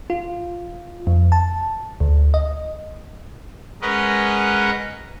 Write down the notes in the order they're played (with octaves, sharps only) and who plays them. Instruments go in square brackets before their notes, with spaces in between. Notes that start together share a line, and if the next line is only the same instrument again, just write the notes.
[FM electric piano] F4
F2
A5
D2
D#5
[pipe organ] G#3 C#4 A#4 B4 D#5 F#5